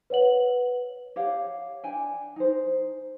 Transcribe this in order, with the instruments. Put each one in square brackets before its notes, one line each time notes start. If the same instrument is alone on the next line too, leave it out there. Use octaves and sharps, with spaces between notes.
[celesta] B4 C#5 F#5 F#7
[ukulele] G4 C#5 F5 F#5
D4 G5 G#5
D#4 C5